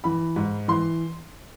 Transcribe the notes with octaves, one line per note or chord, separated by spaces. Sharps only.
E3 B5
G#2
E3 C6